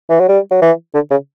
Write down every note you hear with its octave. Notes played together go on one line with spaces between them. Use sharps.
E3
F#3
G3
F#3
E3
D3
C#3